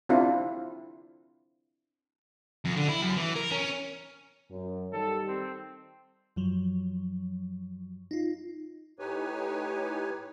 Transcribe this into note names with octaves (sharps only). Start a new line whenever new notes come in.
C4 D4 E4 F4
F2
D3
E4
F#2
E3
A#4
C#4
F#2
D#3 G3 A4
C4
F#2 F3 F#3
D#4 F4
A2 D#4 G4 B4 C#5 G#5